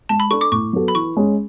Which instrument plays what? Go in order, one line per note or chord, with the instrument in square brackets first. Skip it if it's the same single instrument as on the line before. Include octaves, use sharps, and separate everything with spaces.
[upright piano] G#3 [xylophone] A5
[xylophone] B5
[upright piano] D4 A4 [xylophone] C#6
[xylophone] D6
[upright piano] A2 [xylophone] C#6
[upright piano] F#3 B3 F#4 A4
[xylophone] B5
[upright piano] E3 [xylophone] C#6
[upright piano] G#3 C#4 G#4